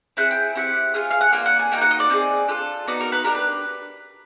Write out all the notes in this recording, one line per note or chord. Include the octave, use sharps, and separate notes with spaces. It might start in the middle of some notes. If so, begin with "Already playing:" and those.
C4 E4 G#4 F#5
G5
C4 E4 G4 F#5
C#4 F4 G#4 F5
F5
F#5
A#3 D4 F4 F5
F#5
G#5
A#3 D#4 F#4 G5
F#5
D#5
D5
C4 D#4 G#4
D4 F4 A4
B3 D#4 F#4 D5
A#4
B4
D4 G4 A#4
B4